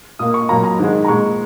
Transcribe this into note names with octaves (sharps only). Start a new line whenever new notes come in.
A#2 A#3 D#6
C#6
A#2 F#3 A#3 A#5
A#5
G#2 D#3 G#3
A#5
A#2 G#3 C#6